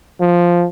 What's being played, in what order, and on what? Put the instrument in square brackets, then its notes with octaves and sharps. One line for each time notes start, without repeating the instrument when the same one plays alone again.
[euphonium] F3